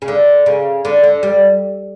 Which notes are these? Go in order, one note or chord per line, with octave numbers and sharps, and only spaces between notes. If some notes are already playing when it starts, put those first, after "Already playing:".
C#3
D3
C#3
D3
D3
G3